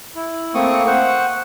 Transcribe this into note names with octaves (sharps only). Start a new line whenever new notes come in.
E4
A3 A#3 C4 C#6 D#6
C5 F#5 C#6